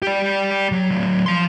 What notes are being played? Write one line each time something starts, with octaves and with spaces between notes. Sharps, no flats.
G4 D5
F#3
A2 F#3
F3 C6